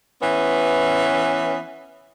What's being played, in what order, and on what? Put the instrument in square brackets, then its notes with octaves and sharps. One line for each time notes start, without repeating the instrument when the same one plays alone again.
[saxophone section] E3 B3 C#4